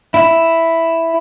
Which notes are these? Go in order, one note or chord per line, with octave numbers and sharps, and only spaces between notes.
E4